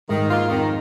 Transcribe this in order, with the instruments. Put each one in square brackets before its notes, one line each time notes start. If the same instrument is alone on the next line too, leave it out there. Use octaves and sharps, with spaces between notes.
[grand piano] G#2 [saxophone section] D#3
[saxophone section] A#3 F4
[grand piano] F2 [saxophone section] D#3